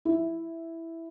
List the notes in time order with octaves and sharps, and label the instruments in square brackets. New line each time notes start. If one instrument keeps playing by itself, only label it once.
[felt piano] E4